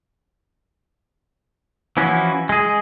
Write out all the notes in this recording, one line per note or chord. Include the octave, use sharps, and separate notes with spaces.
E3 F3 C#4 E4 F#4
G#3 G#4